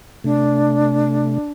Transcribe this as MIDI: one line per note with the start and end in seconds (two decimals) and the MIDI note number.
0.24 1.38 48
0.24 1.38 57
0.24 1.51 62